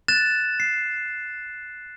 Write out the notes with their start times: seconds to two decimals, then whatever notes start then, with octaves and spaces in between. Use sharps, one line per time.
0.08 F#6 A6 E7
0.60 C7